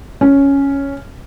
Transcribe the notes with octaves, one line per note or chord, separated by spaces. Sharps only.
C#4